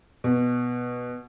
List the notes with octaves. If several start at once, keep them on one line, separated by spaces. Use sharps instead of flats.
B2